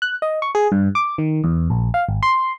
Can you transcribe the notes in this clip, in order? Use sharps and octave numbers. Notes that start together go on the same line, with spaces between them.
F#6
D#5
C#6
G#4
G2
D6
D#3
E2
A#1
F5
G#1
C6